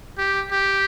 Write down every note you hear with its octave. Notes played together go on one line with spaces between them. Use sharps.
G4
G4